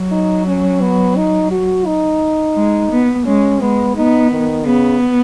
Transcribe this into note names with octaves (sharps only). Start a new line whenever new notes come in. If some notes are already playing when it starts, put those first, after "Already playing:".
Already playing: F#3
D#4
C#4
B3
D#4
F#4
D#4
G#3
B3
G#3 C#4
G#3 B3
B3 D#4
D#3
C#3 B3